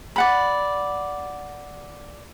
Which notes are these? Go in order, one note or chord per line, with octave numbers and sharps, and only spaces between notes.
D5 F#5 B5